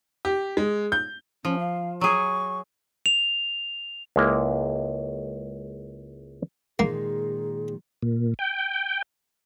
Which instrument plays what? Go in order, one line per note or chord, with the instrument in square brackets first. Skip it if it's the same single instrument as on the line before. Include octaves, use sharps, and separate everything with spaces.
[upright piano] G4
G#3
G6
[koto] F3 [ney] C#4
[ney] F5
[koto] F#3 G#4 [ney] C#6
[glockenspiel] F7
[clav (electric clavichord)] C#2 G#3 A#3 E4 A#5
[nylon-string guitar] A#2 D#3 G#3 [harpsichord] A#3 [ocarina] G#4
[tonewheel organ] A#2
G5